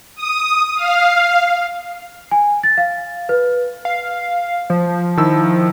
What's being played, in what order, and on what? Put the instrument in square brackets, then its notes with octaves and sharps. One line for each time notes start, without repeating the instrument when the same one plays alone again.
[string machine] D#6
F5
[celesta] G#5
A6
F5
B4
[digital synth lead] F5
F3
[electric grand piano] D#3 E4 E6